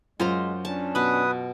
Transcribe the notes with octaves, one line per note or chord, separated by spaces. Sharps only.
F#2 G#3 F4 C5 A#5
C#4 D4 A5
B2 B4 B5 D#6